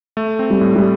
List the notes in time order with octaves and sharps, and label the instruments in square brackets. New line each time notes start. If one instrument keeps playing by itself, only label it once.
[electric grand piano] A3
C4
[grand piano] G3
[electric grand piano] A2
[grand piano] G3